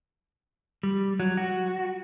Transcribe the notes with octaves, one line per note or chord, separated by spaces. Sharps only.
G3
F#3
F#4